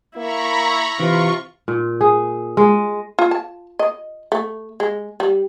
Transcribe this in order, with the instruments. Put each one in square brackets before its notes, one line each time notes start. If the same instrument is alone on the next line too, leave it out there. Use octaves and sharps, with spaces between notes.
[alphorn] A#3 [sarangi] E4 [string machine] A#5 B5 C#6
[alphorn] C3 [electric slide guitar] E3 [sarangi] F4 [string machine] C#6
[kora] A#2
G#4
G#3
[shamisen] F4
A5
D#5
A3
G#3
G3